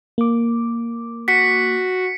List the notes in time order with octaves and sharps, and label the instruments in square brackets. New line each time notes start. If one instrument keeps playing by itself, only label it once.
[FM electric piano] A#3 D6
[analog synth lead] F#4 [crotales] B6 C#7